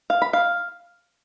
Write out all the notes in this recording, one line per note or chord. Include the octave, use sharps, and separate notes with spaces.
F5
B5
F5